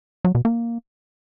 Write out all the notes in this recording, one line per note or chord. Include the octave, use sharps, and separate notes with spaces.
F#3
B2
A#3